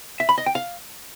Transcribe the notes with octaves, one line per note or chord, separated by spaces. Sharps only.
E5
B5
D#5
G5
F5